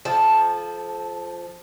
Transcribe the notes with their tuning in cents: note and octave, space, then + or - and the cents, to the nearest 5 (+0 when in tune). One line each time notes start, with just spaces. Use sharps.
F3 +0 A4 -35 A5 +0